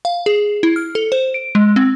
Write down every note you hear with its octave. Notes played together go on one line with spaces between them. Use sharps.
F5
G#4
E4
F6
A4
C5
D7
G#3
C4